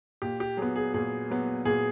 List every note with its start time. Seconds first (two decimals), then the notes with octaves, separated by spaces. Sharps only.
0.22 A#2 G4
0.40 G4
0.57 F#3 B3 G#4
0.76 G#4
0.94 A#2 G#4
1.30 F#3 B3
1.65 A#2 G#4